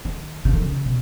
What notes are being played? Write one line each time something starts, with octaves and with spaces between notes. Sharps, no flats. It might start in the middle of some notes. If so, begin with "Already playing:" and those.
D#3
C#3
D#3
C#3
B2